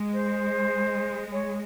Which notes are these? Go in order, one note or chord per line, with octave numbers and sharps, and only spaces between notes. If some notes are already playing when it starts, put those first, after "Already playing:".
Already playing: G#3
C5
C#5